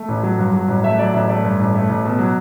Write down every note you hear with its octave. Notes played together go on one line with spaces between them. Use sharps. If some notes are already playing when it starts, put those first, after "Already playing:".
Already playing: A3
A1
F#3
G2
F#3
A1
A3 E5
F#3 D5
A1 E5
A3 D5
G2
A1
A3
A1
B2
F#3